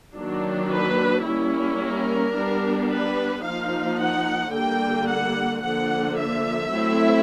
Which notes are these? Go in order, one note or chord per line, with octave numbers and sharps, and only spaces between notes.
D#3 F#3 A#3 D4
B4
G3 A#3 C#4 E4
A#4
G3 B3 D4
B4
F3 A#3 D#4 F5
F#5
D3 G3 A#3 G5
F#5
D3 F3 A#3 F#5
E5
F#3 A3 C4 E4